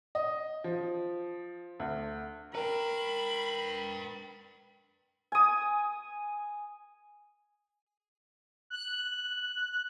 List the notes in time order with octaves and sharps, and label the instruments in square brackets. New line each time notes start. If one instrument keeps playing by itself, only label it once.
[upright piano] D#5
F3
D2
[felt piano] A#4 [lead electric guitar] B4 G5 [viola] B5
[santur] G#5 D#6
[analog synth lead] F#6